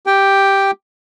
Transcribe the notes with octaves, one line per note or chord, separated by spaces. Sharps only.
G4 G5